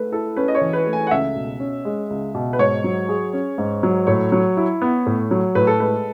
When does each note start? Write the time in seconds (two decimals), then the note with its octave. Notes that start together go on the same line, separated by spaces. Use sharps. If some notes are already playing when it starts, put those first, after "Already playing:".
Already playing: A3 B4
0.12 E4 A4
0.37 C#4 B4
0.48 D#5
0.55 C#5
0.61 E3
0.73 B4
0.86 A3
0.93 G#5
1.07 F#5
1.11 C#2 E5
1.36 B2
1.60 C#4
1.85 G#3
2.10 C#2
2.35 B2
2.53 B4
2.59 G#2 C#5
2.84 F#3
3.09 G#4
3.33 C#4
3.58 G#2
3.83 F#3
4.07 A2 C#5
4.32 F#3
4.57 E4
4.82 B3
5.06 A2
5.31 F#3
5.55 A2 B4
5.67 A4
5.80 G#3 B4